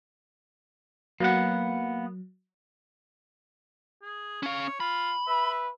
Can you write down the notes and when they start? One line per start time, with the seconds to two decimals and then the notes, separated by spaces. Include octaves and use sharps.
1.20 F#3 A#3 B3 F#5
4.02 G#4
4.43 C#4 C#5 F5
4.80 F4 B5
5.27 B4 E5